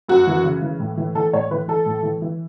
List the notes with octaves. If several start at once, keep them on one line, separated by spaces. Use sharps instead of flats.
F#2 F#4
E3
C#3
E3
A2
E3
E3 A4
A2 C#5
E3 B4
E3 A4
A2
E3
E3